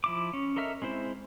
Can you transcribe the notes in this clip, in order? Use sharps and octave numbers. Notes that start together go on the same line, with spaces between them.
F3 E4 D6
C#4
A4 A#4 D#5 E5 F6
G#3 C4 E4 C5